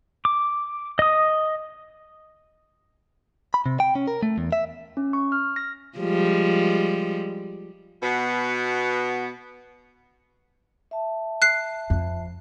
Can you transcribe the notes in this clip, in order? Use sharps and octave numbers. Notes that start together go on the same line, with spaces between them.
D6
D#5 D#6
B5
C3
G5
C#4
A#4
A3
E2
E5
C#4
C#6
F6
A#6
F3 G3 G#3
B2 B3
E5 A5
F#6 C7
F2